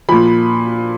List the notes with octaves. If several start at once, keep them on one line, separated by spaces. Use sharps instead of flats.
A#2 F3 B5